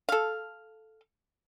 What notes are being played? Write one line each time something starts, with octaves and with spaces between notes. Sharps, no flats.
A4 F5